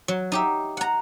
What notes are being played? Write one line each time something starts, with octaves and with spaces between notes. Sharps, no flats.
F#3
D#4 G4 E5
F#5 A#5